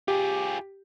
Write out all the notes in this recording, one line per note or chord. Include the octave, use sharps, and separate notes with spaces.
F4 G4 G#4